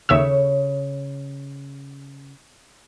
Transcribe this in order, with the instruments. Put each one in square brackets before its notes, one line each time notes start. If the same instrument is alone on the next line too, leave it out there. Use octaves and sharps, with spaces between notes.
[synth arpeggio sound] D#2 E5 E6 [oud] C#3 C#5